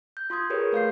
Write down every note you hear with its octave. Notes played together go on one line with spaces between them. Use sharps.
G6
F4 C6 D#6 G#6
G4 G#4 A#4 B4 C#5
A3 F5 G6 C7